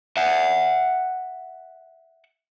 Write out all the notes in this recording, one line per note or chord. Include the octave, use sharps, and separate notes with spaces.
E5 F#5